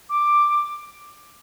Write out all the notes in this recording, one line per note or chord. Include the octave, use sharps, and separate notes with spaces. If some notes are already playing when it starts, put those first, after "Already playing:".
D6